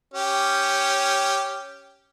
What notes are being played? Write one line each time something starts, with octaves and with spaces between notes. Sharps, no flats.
C#4 G4